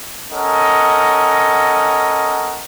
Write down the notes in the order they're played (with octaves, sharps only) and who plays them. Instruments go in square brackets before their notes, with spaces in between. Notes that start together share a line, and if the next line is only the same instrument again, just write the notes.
[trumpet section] C#4 A4 A#4 D#5 F#5